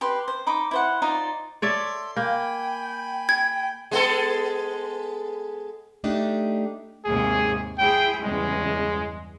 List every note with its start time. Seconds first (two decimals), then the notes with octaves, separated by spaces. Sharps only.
0.01 G4 B4 C6
0.28 C5
0.47 D#4 B5 D6
0.71 E4 C5 F#5
1.02 D#4 F4 C5 D5
1.62 A4 C#5 D5 E5 C6
2.16 A#3 G5 G#5 B5
3.29 G#6
3.91 G#3 B3 A4
6.04 A3 D4 D#4 G4
7.05 D#2 G#2 C3 G#4
7.78 E4 G#4 C5 G5
8.23 E2 G2 C#3 G#3